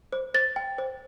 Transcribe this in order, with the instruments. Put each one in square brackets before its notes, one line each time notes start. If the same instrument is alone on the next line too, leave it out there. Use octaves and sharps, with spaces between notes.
[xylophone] C5
C5 A6
G5
C5